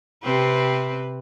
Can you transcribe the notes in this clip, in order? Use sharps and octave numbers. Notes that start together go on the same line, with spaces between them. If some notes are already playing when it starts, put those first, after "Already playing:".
C3 C4 B4